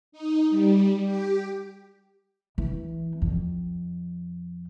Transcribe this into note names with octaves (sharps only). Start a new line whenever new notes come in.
D#4
G3
G4
E3
F2